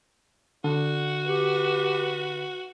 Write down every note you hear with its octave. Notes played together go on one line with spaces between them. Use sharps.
D3 F#4
G4 B4